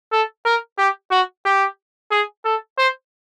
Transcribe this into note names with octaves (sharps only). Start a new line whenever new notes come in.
A4
A#4
G4
F#4
G4
G#4
A4
C5